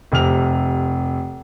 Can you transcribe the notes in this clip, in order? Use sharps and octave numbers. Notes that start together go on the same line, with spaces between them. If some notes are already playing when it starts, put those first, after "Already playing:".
F1 C3 F6 F7